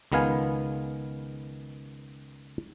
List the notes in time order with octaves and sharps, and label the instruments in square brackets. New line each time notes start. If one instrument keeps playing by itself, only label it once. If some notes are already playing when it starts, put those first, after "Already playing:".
[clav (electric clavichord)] C#2 D#3 B3 F5 G#5